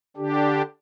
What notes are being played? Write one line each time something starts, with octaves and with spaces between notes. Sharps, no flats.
D3 D4 G4